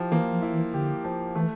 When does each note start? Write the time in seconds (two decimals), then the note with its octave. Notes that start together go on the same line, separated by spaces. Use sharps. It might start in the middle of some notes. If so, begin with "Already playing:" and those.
Already playing: F3 E4 G4
0.11 E3 A#3
0.32 F3
0.42 E4
0.53 E3
0.73 D3 G4
1.04 F3
1.35 E3 A3